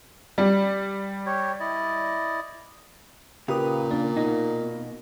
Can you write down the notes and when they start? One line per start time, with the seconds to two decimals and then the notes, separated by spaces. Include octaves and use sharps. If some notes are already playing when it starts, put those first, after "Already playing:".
0.38 G3
1.26 G4 C#5
1.60 E4 D5 D#5
3.48 A#2 C#3 G4 A#4 B4 D#6
3.91 A#3 D4
4.17 B2 D#4